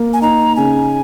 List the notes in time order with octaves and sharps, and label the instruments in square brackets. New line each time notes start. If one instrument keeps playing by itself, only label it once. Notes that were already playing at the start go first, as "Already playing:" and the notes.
Already playing: [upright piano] A#3
[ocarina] G#5
[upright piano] D#4 [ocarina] A#5
[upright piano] C#3 [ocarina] G#5